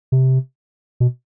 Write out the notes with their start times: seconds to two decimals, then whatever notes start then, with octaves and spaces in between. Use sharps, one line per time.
0.12 C3
1.00 B2